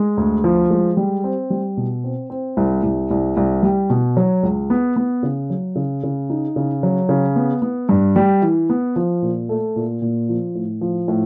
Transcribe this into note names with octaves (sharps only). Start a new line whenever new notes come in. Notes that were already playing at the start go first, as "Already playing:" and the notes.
Already playing: G#3
D2
F3
G#3
G3
C4
G3
B2
C4
C4
C2
C2
C2
C2
G3
B2
F#3
C#2
B3
B3
C#3
F#3
C#3
C#3
D#4
C#3
F#3
C#3
B3
B3
G2
G3
E3
B3
F3
A#2
A3
A#2
A#2
F3
A2
F3
A2